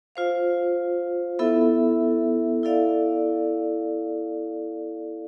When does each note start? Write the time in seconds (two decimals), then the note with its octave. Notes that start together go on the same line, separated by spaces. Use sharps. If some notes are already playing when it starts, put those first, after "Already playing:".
0.16 F4 C5 F5
1.39 B3 E4 A4 E5
2.63 E4 A4 D5 F5